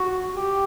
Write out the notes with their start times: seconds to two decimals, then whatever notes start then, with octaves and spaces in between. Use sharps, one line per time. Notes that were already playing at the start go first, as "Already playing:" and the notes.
Already playing: F#4
0.36 G4